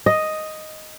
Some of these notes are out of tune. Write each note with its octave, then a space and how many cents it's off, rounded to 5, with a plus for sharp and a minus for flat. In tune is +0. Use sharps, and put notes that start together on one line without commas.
D#5 +0